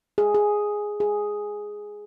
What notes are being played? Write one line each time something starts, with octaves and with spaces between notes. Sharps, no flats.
G#4
G#4
G#4